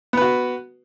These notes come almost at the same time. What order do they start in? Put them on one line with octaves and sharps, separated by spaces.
B3 B4 F#4